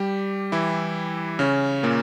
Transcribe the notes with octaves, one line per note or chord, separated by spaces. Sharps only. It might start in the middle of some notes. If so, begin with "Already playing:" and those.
Already playing: G3 G4
E3 E4
C#3 C#4
A#2 A#3